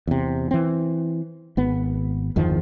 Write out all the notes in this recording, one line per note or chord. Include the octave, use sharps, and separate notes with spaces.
E2 C3
E3 C4
G#1 B3
G1 E2 D#3 F3